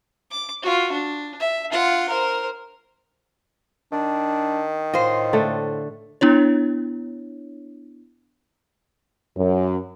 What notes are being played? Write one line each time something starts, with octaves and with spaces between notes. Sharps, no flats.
D6
F4 F#4
D4
E5
F4 F#5
A#4 C5
D#3 D4
A2 F4 C5 D#5
D3 A3
B3 D4 E4 C#5
F#2